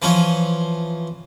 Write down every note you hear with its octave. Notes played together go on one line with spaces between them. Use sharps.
E3 F3 C#4